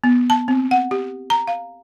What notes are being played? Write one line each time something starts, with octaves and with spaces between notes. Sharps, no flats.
B3
A5
C4
F#5
G4
A#5
F5